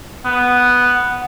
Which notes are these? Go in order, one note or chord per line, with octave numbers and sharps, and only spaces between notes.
B3 F#5